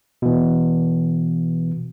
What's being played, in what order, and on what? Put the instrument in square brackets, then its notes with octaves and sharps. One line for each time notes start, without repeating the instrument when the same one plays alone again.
[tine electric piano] B2 E3